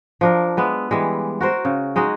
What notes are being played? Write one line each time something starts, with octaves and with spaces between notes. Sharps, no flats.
F3 D4 A#4
G#3 B3 E5
E3 G3 G#3
F#4 A#4 C5
C#3
G#3 D#4 F#4 G#4